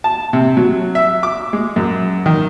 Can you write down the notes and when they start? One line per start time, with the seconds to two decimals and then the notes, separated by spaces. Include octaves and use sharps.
0.04 A5
0.33 C3
0.57 F#3
0.95 E5
1.23 D6
1.53 G#3
1.76 F#2
2.26 D#3